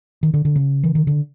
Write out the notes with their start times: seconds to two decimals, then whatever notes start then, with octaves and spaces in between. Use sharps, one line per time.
0.23 D#3
0.34 D3
0.45 D3
0.56 C#3
0.84 E3
0.95 D#3
1.07 D3